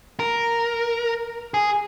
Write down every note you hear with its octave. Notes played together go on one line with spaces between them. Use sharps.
A#4
G#4